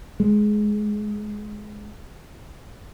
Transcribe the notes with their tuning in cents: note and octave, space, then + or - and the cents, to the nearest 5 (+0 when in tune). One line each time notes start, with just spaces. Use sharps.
G#3 +15